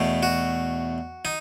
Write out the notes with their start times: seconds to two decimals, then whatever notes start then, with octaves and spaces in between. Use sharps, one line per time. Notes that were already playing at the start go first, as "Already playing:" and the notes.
Already playing: E2 B2 A3
0.23 F#4
1.25 D#4